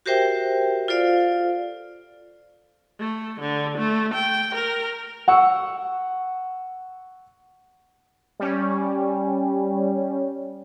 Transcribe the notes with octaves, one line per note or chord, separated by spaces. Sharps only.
F#4 G4 A#4 C5 E5 G5
F4 A4 C5 D5 F5
A3
D3
A3
G5
A#4
F#5 C#6 E6
G3 C#4